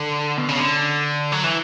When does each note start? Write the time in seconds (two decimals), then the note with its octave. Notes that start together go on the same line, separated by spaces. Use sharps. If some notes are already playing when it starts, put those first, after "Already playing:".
Already playing: D3
0.38 B2
0.48 C#3
0.58 D3
1.32 F#3
1.44 E3